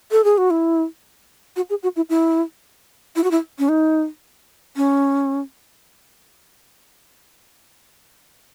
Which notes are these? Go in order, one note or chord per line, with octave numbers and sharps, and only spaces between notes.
A4
G#4
F#4
E4
F#4
G#4
F#4
E4
E4
E4
F#4
E4
C#4
D#4
C#4